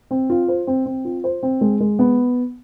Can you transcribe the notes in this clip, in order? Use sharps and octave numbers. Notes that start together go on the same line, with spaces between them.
C4
F4
C5
C4
C4
F4
C5
C4
G#3
G#3
B3